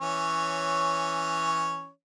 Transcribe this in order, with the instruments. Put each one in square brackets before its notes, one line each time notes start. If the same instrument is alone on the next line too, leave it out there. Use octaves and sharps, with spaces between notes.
[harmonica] E3 C#4 C#5